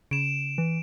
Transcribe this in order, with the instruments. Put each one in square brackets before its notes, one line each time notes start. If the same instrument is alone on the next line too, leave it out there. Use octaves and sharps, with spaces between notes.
[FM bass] C#3 [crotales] D7 E7
[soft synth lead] E3